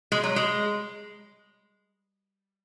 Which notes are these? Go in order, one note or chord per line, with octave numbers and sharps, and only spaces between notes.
G#3
F#3
G#3